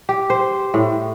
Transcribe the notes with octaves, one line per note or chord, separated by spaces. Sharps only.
G4
C5
A2